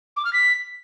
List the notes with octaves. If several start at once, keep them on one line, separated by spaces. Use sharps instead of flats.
D6
F6
B6